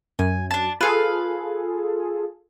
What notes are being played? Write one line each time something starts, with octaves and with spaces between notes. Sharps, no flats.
F#2 G#5
D4 A5
F4 G#4 A4 B4 F5